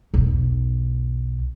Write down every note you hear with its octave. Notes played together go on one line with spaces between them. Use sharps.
B1 E2